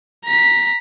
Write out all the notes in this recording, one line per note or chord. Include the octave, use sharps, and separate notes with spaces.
A#5 B6